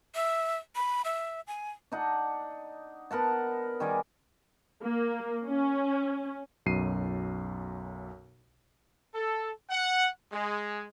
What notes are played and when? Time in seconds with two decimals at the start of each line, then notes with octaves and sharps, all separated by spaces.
0.15 E5
0.76 B5
1.05 E5
1.47 G#5
1.92 D4 D#4 F#5
3.11 B3 A#4 F#5 A5
3.80 D#3 G3 G#4 D5
4.82 A#3
5.47 C#4
6.66 B1 F#2 C7 D#7
9.14 A4
9.70 F#5
10.32 G#3